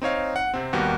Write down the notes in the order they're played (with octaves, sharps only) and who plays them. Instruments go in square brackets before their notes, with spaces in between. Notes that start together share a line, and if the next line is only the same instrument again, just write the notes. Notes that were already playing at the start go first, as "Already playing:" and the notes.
[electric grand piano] C4 D#4 C#5 F5
F#5
C3 C4
D#2 G3 A#3 B3 F#4 G4